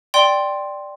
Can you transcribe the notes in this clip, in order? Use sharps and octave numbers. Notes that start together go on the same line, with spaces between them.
D5 G5 C6